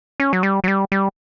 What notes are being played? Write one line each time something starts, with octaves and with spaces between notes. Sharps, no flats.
C#4
F#3
G3
F#3
G3
G3